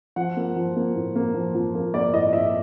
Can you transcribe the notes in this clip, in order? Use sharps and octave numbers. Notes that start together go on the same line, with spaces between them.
F3 F#5
A#3
F3
A#3
A2
A#3
F3
F3
A#3
A#3 D5
A2 D#5
A2 E5